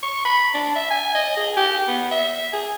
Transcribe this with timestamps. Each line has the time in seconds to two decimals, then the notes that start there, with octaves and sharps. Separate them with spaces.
0.03 C#6
0.25 B5
0.54 D4
0.76 E5
0.91 G#5
1.15 D#5
1.37 G#4
1.57 G4
1.88 B3
2.11 E5
2.53 G#4